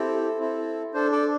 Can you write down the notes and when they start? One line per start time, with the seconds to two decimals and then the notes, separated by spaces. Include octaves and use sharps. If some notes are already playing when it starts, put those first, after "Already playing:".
Already playing: C4 E4 G4 A4
0.39 C4 E4 A4
0.94 D4 A4 C5
1.12 A4 D5